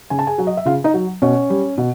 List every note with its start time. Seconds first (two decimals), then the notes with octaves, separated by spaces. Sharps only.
0.10 C#3 G#5
0.19 A5
0.27 G#4 G#5
0.38 F#3
0.47 D#5
0.57 E5
0.66 C#3 F4 F5
0.84 D#4 D#5
0.94 F#3
1.22 B2 C#4 C#5
1.50 G3
1.78 B2